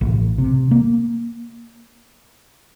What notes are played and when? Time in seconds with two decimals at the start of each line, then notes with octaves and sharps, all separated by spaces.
0.01 A1
0.38 C3
0.71 A#3